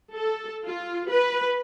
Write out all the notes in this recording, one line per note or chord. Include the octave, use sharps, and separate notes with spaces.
A4
F4
B4